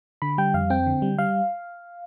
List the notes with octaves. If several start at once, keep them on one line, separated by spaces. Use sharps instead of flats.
D3 B5
G3 G5
F2 F5
C4 G5
D3
G3
G3 F5